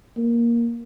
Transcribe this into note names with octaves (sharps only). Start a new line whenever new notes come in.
A#3